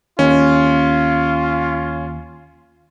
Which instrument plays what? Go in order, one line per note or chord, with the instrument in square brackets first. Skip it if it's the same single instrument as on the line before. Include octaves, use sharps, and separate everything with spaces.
[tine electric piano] D#2 [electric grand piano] C#4 [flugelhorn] F4